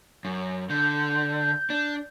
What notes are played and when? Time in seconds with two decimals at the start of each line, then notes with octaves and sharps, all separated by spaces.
0.25 F#2
0.70 D3 G6
1.70 D4